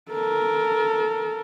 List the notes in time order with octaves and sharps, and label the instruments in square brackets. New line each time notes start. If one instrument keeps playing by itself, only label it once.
[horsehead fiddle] A4 A#4